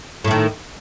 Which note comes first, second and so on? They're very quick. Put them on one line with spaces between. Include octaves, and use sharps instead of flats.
A2 A3 D#3